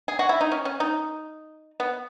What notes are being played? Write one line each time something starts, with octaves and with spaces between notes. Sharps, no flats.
G#4
F#4
E4
D#4
C#4
C#4
D#4
B3